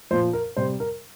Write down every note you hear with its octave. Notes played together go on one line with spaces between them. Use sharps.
A#2 F3 C5
A#4
C3 G3 C5
A#4